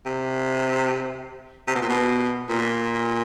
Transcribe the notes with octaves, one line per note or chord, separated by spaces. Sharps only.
C3
C3
B2
A#2
B2
A#2